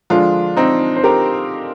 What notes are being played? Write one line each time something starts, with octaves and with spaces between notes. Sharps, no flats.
D3 F3 G#3 D4 F4
C4 D#4
C5
G4 A#4